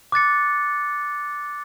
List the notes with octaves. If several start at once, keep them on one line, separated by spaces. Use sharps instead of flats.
D6 F#6 A6 C#7